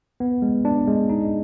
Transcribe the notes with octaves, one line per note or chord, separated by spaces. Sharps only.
B3
G#3
D4
G#3
D#4